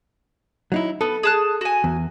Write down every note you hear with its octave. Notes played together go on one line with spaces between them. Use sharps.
F#3 D#4 E4
B3 A4
G#4 A5 F#6
F#4 G#5
E2